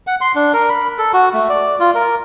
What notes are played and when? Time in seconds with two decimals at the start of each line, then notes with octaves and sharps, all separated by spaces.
0.07 F#5
0.21 C6
0.35 D4
0.54 A#4
0.69 B5
0.98 A4
1.13 F#4
1.34 A3
1.49 D5
1.80 F4
1.95 A#4